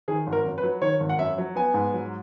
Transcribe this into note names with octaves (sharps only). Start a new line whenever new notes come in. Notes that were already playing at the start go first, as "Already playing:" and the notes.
D#3 G#4
G#1
A#4
F#2
B4
F#3
D#3 C#5
G#1
F#5
F#2 E5
F#3
B3 G#5
G#2
F#3